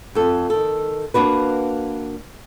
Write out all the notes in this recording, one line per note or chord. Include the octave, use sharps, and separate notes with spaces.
F2 A4
D#3 A4
A#3 D4 F#4 B4